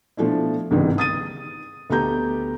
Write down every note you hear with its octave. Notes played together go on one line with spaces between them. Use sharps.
B2 F3 A3 D4 E4
G1 C#2 G#2 C3 D#3 E3
D#6 A6 D#7
D2 A3 B3 G4 A#5 G6